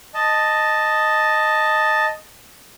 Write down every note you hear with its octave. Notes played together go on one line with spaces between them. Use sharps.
D#5 A5